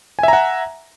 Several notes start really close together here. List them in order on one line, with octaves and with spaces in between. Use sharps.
G#5 E5 A#5 F#5